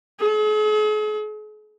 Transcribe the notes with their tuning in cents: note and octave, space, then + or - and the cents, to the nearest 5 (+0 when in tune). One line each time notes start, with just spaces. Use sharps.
G#4 +45